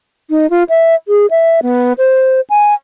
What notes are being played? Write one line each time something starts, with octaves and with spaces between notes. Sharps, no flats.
D#4
F4
E5
G#4
E5
B3
C5
G#5